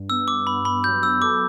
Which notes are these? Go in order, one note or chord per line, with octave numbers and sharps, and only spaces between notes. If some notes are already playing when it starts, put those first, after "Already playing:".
Already playing: G2
B3 E6
D6
B3 B5
B5
F#3 G6
E6
A4 D6